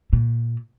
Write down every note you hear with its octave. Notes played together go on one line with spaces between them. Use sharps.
A#2